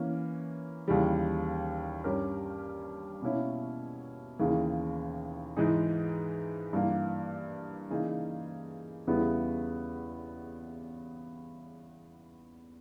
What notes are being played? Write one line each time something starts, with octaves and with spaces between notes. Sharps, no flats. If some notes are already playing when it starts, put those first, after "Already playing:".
Already playing: E3 A#3 C#4
D#2 C#3 E3 G3
G2 G3 C#4 G4 A#4
B2 A#3 C#4 E4
D#2 C#3 E3 A#3
G#2 E3 G#3 D#4 G#4
G2 E3 A#3
C#3 E3 A#3 D#4 G#4
E2 C#3 G3 B3 E4